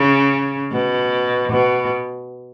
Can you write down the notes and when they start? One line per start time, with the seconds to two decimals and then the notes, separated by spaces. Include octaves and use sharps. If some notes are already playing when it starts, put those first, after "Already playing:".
Already playing: C#3
0.72 B2
1.52 B2